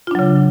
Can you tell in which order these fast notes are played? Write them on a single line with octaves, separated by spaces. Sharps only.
F4 D4 F#3 C#3